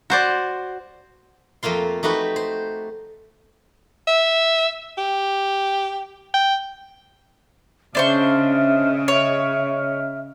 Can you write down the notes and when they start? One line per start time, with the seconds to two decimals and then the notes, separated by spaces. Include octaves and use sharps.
0.10 F#4 C5 D5
1.63 F2 A3 A#3 F4 C6
2.03 A3 D#4 F#4 G4 B4
2.36 C5
4.07 E5
4.98 G4
6.34 G5
7.95 C#3 D4 C5 D#5 E5 C#6 F6
9.08 C#5